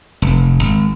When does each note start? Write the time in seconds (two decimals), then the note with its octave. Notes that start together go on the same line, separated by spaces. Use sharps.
0.22 F1
0.63 G#1